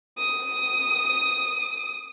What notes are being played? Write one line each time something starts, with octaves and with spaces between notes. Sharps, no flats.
D#6